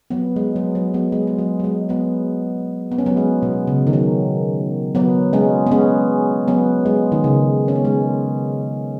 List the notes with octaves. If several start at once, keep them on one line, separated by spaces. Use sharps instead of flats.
F#3 B3
G#3
F#3
F#3
F#3 B3
G#3
G#3
F#3
F#3
G#3
F#3 B3
B3
C#4
F#3 B3
G#3
B2
C#3
D#3
F#3
F#3 B3
G#3 C#4
B3
G#3 C#4
F#3 B3
G#3
D#3
C#3
C#4
B3
G#3